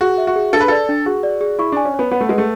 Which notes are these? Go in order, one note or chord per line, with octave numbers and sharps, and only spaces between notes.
F#4 G#4
E5
F#4
G#4
D4 A4
B4
A4 D5
D4
F#4 G#4
D5
G#4
E4 C#6
D4 G#5
C#4
B3 C#5
B3 F#5
A3
G#3 B4
A3